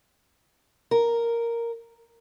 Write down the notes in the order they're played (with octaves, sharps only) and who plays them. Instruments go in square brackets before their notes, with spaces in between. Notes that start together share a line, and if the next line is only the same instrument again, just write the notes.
[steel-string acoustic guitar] A#4